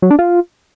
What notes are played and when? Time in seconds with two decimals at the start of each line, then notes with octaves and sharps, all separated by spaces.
0.02 F#3
0.11 D4
0.19 F4